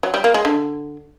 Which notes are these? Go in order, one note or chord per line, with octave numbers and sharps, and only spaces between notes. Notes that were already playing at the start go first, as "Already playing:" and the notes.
F#3
G3
A#3
G#3
D3